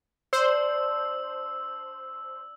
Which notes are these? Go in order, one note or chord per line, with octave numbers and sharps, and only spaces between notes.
D4 C5 E6